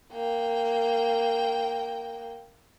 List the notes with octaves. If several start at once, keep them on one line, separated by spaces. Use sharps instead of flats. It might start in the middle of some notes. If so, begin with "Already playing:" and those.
A#3 G5